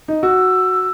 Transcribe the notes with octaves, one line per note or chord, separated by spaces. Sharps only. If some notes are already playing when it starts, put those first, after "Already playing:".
D#4
F#4 E6